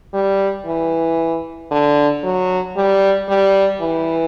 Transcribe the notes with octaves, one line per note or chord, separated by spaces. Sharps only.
G3
E3
D3
F#3
G3
G3
E3